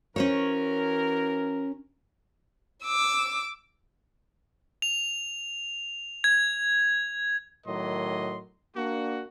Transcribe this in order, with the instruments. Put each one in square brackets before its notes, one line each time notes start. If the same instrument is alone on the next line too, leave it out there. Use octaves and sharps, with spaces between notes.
[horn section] E3 F#4 A#4 [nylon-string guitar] C#4 C5 C#5
[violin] D6 E6
[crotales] F7
G#6
[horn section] A2 D#3 F#3 A#4 D#5 C6
A#3 D4 F#4